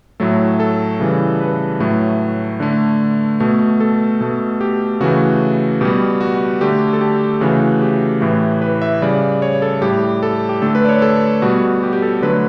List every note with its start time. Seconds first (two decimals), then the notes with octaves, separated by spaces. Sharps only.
0.20 A2 F#3 A3 A4
0.60 A4
1.00 C#3 E3 G3
1.40 B4
1.80 A2 F#3 A3
2.60 D3 A3
3.40 B2 A3
3.80 A4
4.21 B2 A3
4.61 G4
5.00 C#3 E3 A3 F#4
5.81 B2 G3 G4
6.21 F#4
6.61 D3 A3 G4
6.93 A4
7.01 G4
7.41 C#3 E3 A3 F#4
7.82 G4
8.21 A2 E3 A3
8.61 B4
8.82 E5
9.02 C#3 G3 D5
9.42 C#5
9.62 A4
9.81 A2 G3 G4
10.23 A4
10.49 G4
10.62 D3 A3 A4
10.75 B4
10.85 D5
10.89 C#5
11.02 A4
11.42 B2 G3 F#4
11.83 G4
11.93 G4
12.02 A4
12.22 D3 F#3 A3 B4